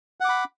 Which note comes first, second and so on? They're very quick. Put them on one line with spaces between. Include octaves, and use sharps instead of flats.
F#5 D6 B5